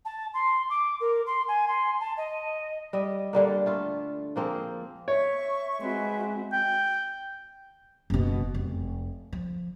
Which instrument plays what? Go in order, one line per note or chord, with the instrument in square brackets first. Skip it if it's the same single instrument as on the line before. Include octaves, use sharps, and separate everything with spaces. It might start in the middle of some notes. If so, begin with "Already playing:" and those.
[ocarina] A5
C6
D6
A#4
C6
G#5
C6
A5
D#5
[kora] G3 D#5 E5
D3 G3 A#3
A3 F4 A4
F3 A#3 C4 G#4
[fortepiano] C#5 [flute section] E5 C#6
[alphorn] G#3 [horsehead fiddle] C4 F#4 [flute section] B4 E5 C6
[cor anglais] G5
[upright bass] F#1 B2
F1
F3